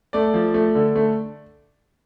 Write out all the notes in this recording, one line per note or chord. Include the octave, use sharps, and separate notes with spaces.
A3 D5
F3
A3
D3
A3